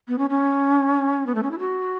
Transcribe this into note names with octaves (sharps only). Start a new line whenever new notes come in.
B3
C#4
C#4
B3
A3
C#4
E4
F#4